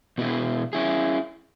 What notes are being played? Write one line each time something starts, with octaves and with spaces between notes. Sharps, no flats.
B2 B3 E4 G#4
C#4 E4 G#4